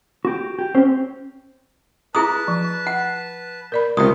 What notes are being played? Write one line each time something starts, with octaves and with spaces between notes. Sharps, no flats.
F#4 G4
G4
C4 C#4 C5
E4 G#4 B4 A5 A#5 D#6
F3
F#5
A#4 D5 B5
C#2 C3 F4 A#4 C6 C#6 D#6